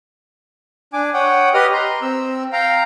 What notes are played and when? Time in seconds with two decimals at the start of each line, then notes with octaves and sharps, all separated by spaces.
0.93 D4 G#5 D6
1.14 C#5 F#5 G5 D#6
1.54 G4 B4 D#5 D#6 F6
1.73 A#5 C6
2.02 C4 E6
2.53 F5 G5 A#5